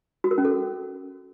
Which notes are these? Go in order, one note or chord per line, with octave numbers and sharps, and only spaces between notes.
F#4
A#4
C#4
A4